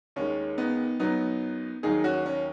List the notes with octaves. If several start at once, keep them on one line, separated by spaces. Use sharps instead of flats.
D#2 D#3 G#3 C#4
B3 D#4
F#2 F#3 B3 D#4
D#2 D#3 F#3 D#4 G#4
C#4 F#4
C#4